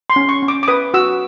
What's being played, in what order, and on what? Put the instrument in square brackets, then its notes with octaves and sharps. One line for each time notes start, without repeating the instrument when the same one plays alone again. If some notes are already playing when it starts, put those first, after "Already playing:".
[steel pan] C6
C#4
C#6
C#4
D6
D6
B4 D#6
F#4 E6